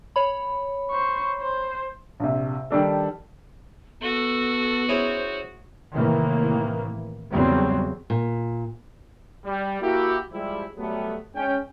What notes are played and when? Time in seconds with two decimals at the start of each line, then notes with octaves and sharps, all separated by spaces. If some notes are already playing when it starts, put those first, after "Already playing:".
0.16 C#5 B5
0.91 C5 C#6
1.41 C5
2.20 A#1 C3
2.71 D#3 G3 D4 A4
4.02 B3 F#4 A4
4.89 C#4 E4 G#4 C5
5.93 A2 C3 D#3 E3 A#3
7.32 E2 C#3 F#3 G3 C4
8.10 A#2
9.46 G3
9.82 A#3 E4 F#4 G4
10.33 F3 G3 G#3 E4
10.77 F#3 G3 A3 B3
11.35 G#3 C#4 G5